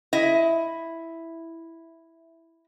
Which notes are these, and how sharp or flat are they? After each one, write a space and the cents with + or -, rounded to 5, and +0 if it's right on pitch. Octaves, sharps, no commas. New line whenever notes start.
E4 +0 D#5 +25